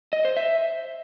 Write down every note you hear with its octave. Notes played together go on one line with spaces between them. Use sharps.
D#5
C5
E5